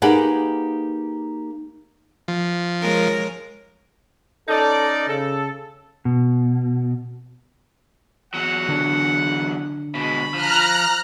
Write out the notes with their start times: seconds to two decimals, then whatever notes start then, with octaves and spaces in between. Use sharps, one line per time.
0.02 A#3 D#4 G4 G#4 B4 F#5
2.28 F3
2.82 G#3 A#4 C#5
4.48 C#4 D#4 A4 D5
5.08 C#3 A4
6.05 B2
8.34 E2 F#3 F#5
8.68 D3 D4
9.95 B2 G#3 B5
10.34 F3 A#5 F6 F#6